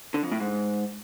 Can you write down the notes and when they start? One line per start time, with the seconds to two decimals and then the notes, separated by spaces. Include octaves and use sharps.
0.14 D3
0.23 F2
0.32 A2
0.40 G#2